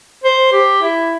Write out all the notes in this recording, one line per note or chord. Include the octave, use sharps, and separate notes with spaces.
C5
G4
E4